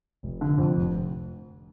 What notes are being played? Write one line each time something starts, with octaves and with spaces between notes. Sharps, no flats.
F1
D3
F2
F1